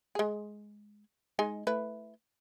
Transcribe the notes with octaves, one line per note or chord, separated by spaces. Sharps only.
G#3 G#4
G#3 D#4 G#5
A3 E4 B4